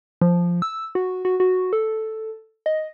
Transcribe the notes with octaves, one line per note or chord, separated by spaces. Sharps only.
F3
E6
F#4
F#4
F#4
A4
D#5